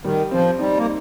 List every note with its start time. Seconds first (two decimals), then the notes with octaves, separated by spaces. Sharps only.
0.03 D#3 G3
0.31 F3 C4
0.59 G3 D#4
0.77 A#3